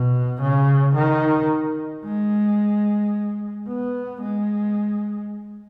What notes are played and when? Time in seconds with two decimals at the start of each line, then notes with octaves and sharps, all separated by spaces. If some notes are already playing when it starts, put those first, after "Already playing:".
Already playing: B2
0.41 C#3
0.96 D#3
2.05 G#3
3.68 B3
4.22 G#3